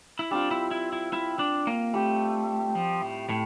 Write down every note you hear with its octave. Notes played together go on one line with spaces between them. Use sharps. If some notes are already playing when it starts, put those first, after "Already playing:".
E4
G3 C4 D4 F4
E4
E4
E4
E4
D4
A#3
G3 A3 C4 G4
F3
A2
A2